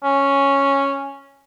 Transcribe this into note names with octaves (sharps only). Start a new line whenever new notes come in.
C#4